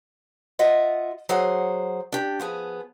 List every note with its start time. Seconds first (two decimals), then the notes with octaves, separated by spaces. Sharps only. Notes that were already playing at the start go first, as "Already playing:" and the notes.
0.59 F4 D#5 E5 F#5
1.29 F#3 G#4 C5 F#5
2.12 D4 G4
2.40 F3 B3 G#4